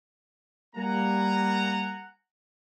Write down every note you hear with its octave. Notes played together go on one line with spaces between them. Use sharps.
G3 A#3 F#5 G#5 A#5